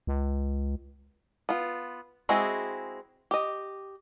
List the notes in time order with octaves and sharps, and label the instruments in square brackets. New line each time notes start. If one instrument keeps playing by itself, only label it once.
[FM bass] C#2
[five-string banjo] B3 F4
G#3 C4 E4 F#4 G#4
G4 D#5